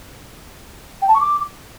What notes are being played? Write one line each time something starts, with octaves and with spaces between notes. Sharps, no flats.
G5
A5
C#6
D6